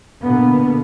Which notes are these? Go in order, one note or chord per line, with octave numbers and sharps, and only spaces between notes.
B2 D3 A#3 B3